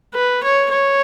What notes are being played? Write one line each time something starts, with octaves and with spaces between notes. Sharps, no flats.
B4
C#5
C#5